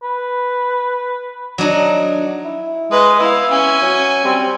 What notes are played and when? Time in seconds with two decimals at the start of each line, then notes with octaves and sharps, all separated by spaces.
0.03 B4
1.58 F#3 D4 D#4
2.45 E4
2.91 G#3 B4 D#5
3.20 B3 E4 E5 F5
3.50 C#4 G#5
3.82 F#3
4.25 G3 C4